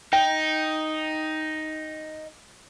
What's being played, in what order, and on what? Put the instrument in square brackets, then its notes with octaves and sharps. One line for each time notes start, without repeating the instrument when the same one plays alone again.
[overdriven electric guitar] D#4 [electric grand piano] G5